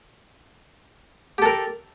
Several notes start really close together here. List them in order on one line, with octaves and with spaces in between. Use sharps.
G4 A4 A#4